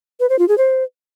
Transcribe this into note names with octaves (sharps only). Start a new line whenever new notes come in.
B4
C5
F4
G#4
C5